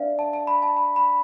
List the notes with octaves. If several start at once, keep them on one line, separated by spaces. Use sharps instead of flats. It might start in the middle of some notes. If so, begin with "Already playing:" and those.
Already playing: D4 B4 D5 E5 F5
A5
A5
B5
A5
B5
B5